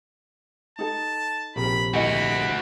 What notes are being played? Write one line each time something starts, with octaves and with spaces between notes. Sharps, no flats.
D#4 A4 A5
A#1 C3 A#4 B5
A3 E4 F#4 D#5 G#5 B5